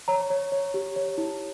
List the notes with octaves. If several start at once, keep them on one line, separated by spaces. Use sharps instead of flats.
C#5 A#5
C#5
C#5
G4
C#5
E4